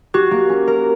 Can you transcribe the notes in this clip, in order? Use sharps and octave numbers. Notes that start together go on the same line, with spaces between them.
F#4 G4
A#3
C#4
A#4